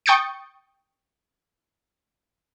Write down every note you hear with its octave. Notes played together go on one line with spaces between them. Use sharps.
G5 C#6 D#6 G6 A6 C#7